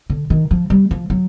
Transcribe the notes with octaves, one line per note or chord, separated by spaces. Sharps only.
D3
D#3
F3
G3
F3
F#3